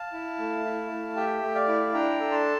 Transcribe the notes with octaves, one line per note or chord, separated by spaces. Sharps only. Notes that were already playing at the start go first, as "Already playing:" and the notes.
Already playing: F5 A5
E4
A3
E4
A3
G4 E5 G5
A3
D5 F5
E4
D4 G5 A#5
A4
A5 C6